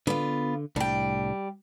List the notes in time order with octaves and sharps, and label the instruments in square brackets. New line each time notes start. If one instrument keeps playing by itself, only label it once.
[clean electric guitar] D3 [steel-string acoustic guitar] B3 F4
[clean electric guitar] C2 A2 D4 [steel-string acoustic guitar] G3 G5